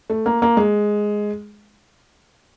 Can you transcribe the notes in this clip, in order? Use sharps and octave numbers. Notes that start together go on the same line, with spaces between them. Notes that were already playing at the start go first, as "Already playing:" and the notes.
A3
A#3
A#3
G#3